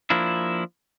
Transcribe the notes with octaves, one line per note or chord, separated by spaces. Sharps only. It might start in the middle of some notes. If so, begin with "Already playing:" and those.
F3 A#3 D4 E4